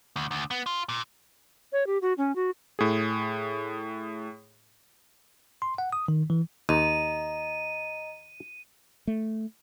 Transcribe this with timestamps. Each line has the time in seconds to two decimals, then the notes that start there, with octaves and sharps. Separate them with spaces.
0.16 D2
0.31 D2
0.51 B3
0.66 F4
0.89 A#2
1.73 C#5
1.87 G4
2.02 F#4
2.18 C#4
2.36 F#4
2.79 A2 G#4
5.62 C6
5.78 F#5
5.93 D#6
6.08 D#3
6.30 E3
6.69 D#2 D#5 A#5 D#7
9.07 A3